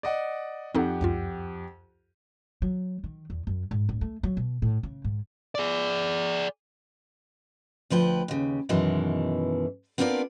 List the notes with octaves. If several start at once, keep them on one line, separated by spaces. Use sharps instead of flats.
D5 D#5 F#5
F2 C4 D#4 G4 A4 F#5
C#2 F#2 F4
F#3
D#3
E2
F#2
G#2
D1
A3
F#3
B2
A2
C#3
G#2
G#4 D5
D2 F3 B4 G5
D#2 C#3
F#2 B2 D#3 E3 G#3
B3 C4 D4 F4 A#4 D5